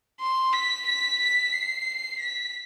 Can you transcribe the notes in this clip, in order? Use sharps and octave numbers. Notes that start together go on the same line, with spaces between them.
C6
B6
B6
B6
C7
B6